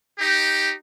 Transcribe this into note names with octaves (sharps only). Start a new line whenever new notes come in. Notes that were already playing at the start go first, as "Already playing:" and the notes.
D#4 G4